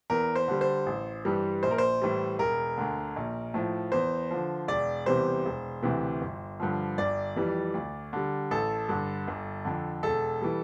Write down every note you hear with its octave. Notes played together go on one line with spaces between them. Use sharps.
E2 A#4
C5
D3 G3
C5
A1
G2 E3 G3
A#1 C5
A#4
C5
A2 E3 G3
E1 A#4
D2 D3
A#1
A2 F3
E2 C5
D3 F3
E1 D5
E2 C3 E3 G3 C5
E1
D2 C3 E3
G1
G2 D3 F3
G1 D5
F2 E3 G3
D2
D3 G3
A1 A4
G2 D3
G1
F2 D3
E1 A4
E3 G3